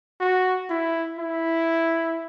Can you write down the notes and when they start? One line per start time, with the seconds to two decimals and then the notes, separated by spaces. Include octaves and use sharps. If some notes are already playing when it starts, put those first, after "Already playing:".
0.20 F#4
0.70 E4
1.18 E4